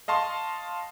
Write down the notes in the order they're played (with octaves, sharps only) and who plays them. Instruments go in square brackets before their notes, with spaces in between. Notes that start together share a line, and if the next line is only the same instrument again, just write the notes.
[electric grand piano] D#5 F5 A5 C6 C#6